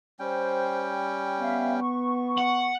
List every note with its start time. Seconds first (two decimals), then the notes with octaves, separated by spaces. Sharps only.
0.19 G3 C#4 C5 G5
1.40 B3 E5 F5
1.81 C#6
2.38 F#5